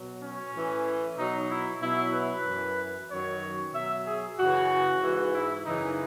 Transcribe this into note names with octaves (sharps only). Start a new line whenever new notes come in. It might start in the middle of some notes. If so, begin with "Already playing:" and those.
Already playing: B2 F#3
C#4
A2 E3
B2 F#3 D#4
E4
B2 F#3 E4
B4
F#2 E3
F#2 D#3 F#3 C#5
B2 F#3 E5
G#4
F#2 C#3 E3 F#4
G#2 E3
E4
F#2 C#3 E3 D#4